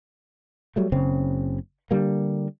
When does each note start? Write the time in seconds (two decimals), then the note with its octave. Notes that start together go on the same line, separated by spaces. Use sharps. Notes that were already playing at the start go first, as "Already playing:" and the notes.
0.76 F#3 G3 A3
0.92 F#1 C#3 C4 C#4
1.91 D3 G3 A#3